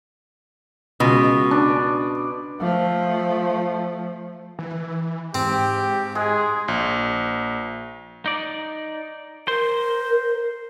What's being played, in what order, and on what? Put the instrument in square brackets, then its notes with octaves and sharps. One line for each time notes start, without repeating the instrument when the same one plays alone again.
[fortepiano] C#2 [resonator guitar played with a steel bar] B2
[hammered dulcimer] D4
[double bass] F3 A3
[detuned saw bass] E3
[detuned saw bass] G#2 [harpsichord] C4 [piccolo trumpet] G4
[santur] G#3 [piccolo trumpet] G#4
[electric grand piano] A#1
[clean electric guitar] D#4 D5
[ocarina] A#4 [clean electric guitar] C5